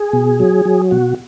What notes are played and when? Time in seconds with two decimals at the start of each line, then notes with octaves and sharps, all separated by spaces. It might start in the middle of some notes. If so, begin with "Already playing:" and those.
Already playing: G#4
0.13 B2
0.40 F#3
0.65 F#3
0.91 B2 F#4